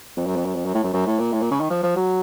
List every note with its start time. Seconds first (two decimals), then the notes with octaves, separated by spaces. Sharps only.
0.17 F2
0.26 F#2
0.36 F2
0.45 F#2
0.55 F2
0.65 F#2
0.74 A2
0.83 F#2
0.94 F#2
1.06 A2
1.19 A#2
1.32 A2
1.41 A#2
1.51 C#3
1.60 D#3
1.70 F3
1.83 F3
1.96 F#3